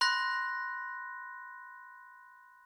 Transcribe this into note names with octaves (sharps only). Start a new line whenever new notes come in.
B5 C6 F#6 A#6